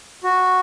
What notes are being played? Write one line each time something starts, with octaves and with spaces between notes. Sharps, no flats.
F#4